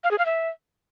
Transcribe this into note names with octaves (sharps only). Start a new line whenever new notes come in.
F5
G#4
F5
E5